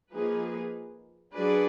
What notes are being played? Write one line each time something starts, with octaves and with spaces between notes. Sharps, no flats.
F3 A#3 D#4 G#4 B4
F#3 D4 G#4 B4 D5